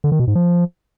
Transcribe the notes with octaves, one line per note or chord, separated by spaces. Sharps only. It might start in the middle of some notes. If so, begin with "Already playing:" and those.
D3
D#3
B2
G#2
F3